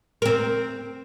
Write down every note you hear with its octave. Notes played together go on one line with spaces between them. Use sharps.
C4 A#4